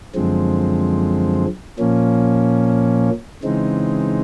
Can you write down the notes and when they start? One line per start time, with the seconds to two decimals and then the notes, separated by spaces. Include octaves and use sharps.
0.15 F#2 D3 F3 G#3 C4
1.79 A#2 F3 A#3 C#4
3.43 C#3 E3 G#3 C4 D#4